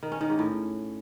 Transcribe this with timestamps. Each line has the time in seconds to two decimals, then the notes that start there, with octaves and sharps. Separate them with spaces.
0.03 D#3
0.12 C#4
0.21 D#3
0.30 G#2
0.39 A2